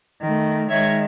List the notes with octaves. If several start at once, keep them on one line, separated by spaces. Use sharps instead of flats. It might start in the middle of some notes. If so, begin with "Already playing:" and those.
D#3 A3
D#3 G#3 C#5 E5